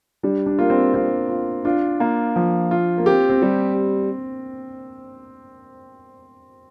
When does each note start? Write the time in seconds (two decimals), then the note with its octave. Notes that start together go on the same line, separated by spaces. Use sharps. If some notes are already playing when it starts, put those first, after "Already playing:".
0.23 G3 D4
0.46 D4
0.59 A#3 F4
0.70 C4
0.94 C4 F4
1.29 F4
1.65 D4 F4
2.00 A#3
2.36 F3
2.71 F4
2.98 A#3
3.06 C4 G4
3.29 C4
3.42 G3